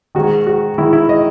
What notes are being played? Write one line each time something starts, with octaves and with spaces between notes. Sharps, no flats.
G#2 D#3 F#4
F#4
G#2 D#3 E4
E4
D#5